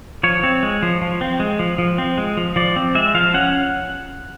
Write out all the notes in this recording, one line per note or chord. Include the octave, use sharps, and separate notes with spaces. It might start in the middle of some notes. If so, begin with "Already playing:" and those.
F3 C#5
C4
G#3
F3
F3
C4
G#3
F3
F3
C4
G#3
F3
F3 D5
C4
G#3 E5
F3 F5
C#4 F#5